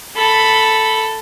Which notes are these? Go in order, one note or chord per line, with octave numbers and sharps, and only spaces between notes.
A4 B5